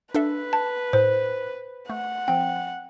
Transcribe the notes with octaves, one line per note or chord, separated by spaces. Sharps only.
D4 A4 B4 E5
A5
A2 C5
A3 F#5
F3 C4 G5